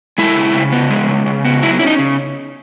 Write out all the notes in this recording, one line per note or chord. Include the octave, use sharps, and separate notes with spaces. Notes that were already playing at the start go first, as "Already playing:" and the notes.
G#3 E4
C#3
C#3
B3
G#3
C#3
C#3
B3
F#3 E4
C#4 E4
D#4
C#3